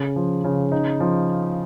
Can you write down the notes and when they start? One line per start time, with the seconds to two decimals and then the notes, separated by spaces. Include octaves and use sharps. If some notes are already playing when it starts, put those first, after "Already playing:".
Already playing: C#3
0.16 F3
0.44 C#3
0.72 D#4
1.00 F3